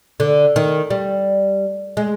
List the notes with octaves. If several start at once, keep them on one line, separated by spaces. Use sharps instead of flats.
D3
D#3
G3
G#3